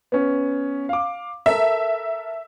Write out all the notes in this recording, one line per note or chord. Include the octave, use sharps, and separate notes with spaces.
B3 C#4
F5 D6
A4 A#4 E5